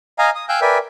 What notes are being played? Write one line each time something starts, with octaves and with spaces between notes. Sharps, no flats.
D#5 F5 G#5 A#5
D#6
F5 G5 G#5 E6 F#6 G6
A#4 B4 D5 E5 G5 G#5